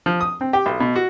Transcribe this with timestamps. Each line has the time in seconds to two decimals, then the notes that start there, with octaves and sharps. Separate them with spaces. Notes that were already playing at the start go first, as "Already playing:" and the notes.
0.06 F3
0.21 D#6
0.41 C4
0.53 G4
0.66 B1
0.80 B2
0.96 F#4